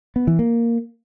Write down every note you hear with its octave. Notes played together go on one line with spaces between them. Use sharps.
B3
E3
A#3